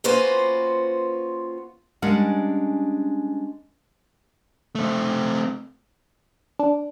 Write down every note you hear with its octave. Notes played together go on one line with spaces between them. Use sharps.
A#3 C#4 F4 F#4 B4 C5
G3 G#3 C#4 D4 A#4 F#5
A3 C4
D4